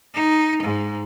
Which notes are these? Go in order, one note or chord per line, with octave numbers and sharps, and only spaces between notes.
D#4
G#2